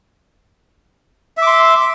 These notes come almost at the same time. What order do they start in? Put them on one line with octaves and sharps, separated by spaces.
E5 D6 C6